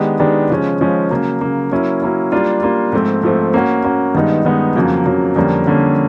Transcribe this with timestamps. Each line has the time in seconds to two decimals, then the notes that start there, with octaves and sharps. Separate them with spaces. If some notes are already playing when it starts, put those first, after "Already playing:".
Already playing: D#3 G#3 B3 D4 G4
0.19 D#3 G#3 B3 D4 G4
0.50 C#3 F3 G#3 C#4
0.81 C#3 F3 G#3 C#4
1.11 C#3 F#3 A#3
1.41 C#3 F#3 A#3
1.71 F#3 A#3 C#4 E4
2.02 F#3 A#3 C#4 E4
2.32 G3 A#3 D4 F4
2.63 G3 A#3 D4 F4
2.92 G#2 F3 A3 C4
3.23 G#2 F3 A3 C4
3.54 A#3 C#4 F#4
3.84 A#3 C#4 F#4
4.15 G2 D#3 G#3 B3 D#4
4.45 G2 D#3 G#3 B3 D#4
4.76 F2 C#3 F#3 A#3
5.06 F2 C#3 F#3 A#3
5.36 F2 D3 G3 A#3 C#4
5.66 F2 D3 G3 A#3 C#4